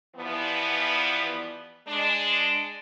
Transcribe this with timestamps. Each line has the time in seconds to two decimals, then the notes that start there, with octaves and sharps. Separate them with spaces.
0.16 E3 F3 G3 B3
1.88 G#3 D4